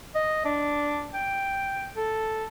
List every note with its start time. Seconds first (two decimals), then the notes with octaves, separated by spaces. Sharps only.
0.15 D#5
0.45 D4
1.14 G5
1.96 A4